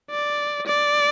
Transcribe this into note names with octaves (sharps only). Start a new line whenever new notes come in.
D5
D5